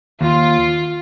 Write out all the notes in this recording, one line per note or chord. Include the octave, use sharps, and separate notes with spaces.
D#2 F4